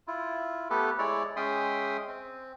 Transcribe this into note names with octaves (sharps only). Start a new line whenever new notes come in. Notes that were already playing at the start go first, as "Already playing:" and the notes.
E4 F4
A3 B3 G4 A4 B4
G#3 E4 C#5 D5
G#3 C#4 E5 G5 C6 D#6
C4